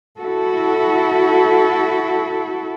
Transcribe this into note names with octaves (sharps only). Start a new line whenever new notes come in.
E4 F#4 A4